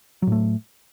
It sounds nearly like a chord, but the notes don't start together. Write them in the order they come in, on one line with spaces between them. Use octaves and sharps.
F#3 A2 A3